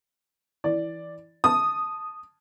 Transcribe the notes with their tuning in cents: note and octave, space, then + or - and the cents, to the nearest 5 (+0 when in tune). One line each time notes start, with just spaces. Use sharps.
E3 +0 D5 +0
A5 +0 D#6 -5